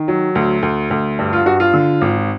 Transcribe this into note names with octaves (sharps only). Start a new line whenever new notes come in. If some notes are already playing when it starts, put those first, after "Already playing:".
Already playing: D#3
F#3
D2
D2
D2
G2
F4
G2 F#4
F4
D3
G#1